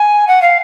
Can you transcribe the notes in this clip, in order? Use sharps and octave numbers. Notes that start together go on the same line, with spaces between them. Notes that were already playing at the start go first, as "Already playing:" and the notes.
Already playing: G#5
F#5
F5